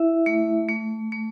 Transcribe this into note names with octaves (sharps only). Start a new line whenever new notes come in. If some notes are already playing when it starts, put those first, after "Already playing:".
Already playing: E4 E5
A3
A3
A3